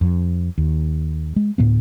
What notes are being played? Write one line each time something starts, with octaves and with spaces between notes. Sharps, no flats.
F2
D#2
G#3
D2 A2 G#3 B3